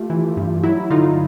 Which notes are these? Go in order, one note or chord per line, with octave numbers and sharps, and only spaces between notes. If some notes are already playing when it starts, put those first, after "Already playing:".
Already playing: A3 F4 G4
E3
G2
F#3 E4
D3 D#4 F4